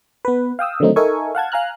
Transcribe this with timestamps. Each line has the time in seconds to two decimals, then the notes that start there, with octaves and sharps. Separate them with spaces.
0.25 B3 B4
0.59 F5 G5 D#6 E6
0.80 D3 D#3 F#3 A3 C4 D#4
0.96 D#4 A4 A#4 E5 G#5 C#6
1.35 F5 F#5 A5 G#6
1.52 F5 G#5 A#5 F6 F#6